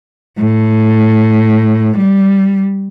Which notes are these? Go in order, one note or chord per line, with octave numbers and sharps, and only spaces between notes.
A2
G3